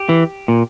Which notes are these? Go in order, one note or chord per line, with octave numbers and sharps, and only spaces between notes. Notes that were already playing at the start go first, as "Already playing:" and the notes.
Already playing: G4
E3
A#2